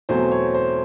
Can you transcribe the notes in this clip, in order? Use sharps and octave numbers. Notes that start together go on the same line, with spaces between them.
E2 B2 F#3 A3 C4 C5
C#5
C5